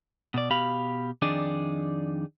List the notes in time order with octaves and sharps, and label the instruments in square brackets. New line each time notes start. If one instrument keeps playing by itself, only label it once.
[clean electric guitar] B2 D5
B2 G4 F5 B5
F2 D#3 D4 D#4 G#4 D5